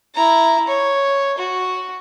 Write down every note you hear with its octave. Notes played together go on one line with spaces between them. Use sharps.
E4 A#5
C#5
F#4